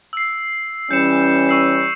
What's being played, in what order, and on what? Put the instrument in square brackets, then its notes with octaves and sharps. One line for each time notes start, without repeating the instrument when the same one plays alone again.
[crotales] E6 C7
[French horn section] E3 G3 C#4 [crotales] G6 C#7 E7
[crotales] C#6 E6 C7